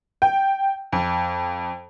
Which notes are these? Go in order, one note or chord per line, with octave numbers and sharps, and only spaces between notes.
G5
F2